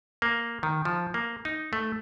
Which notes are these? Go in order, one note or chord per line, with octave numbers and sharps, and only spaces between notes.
A#3
D#3
F3
A#3
D#4
A3